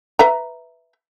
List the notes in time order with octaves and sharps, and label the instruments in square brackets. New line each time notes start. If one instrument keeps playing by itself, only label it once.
[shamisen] B4 E5 A#5